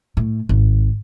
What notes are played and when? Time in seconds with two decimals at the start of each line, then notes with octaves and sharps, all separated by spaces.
0.17 A2
0.49 G#1